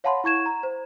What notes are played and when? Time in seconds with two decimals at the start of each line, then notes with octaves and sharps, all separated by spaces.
0.04 C#5 F5 F#5 A5 B5 C6
0.24 E4 C#6 G#6 E7
0.46 A#5
0.63 C5